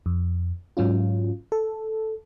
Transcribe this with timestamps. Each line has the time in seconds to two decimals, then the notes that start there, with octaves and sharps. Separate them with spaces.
0.06 F2
0.77 G#2 F#3 C#4 F4
1.52 A4